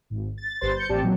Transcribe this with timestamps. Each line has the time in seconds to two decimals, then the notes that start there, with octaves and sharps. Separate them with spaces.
0.10 G#1
0.38 A6
0.61 G1 G3 B4 C5 C6 A6
0.76 G6 C#7
0.89 A1 C4 G4 D5 A5
1.02 A#2 F#3